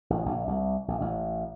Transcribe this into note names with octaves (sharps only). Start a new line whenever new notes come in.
A1
A#1
C2
A#1
A1